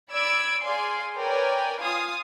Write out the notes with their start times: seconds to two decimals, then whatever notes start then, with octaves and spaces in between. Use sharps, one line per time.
0.10 D5 B5 E6 G#6 D7
0.64 G#4 D5 F5 G#5 C6
1.17 A#4 B4 C#5 D5 G5 G#5
1.81 F4 F5 G#5 D#6